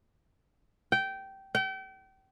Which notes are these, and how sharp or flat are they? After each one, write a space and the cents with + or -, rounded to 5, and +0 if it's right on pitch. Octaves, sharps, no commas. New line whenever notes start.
G5 -15
G5 -35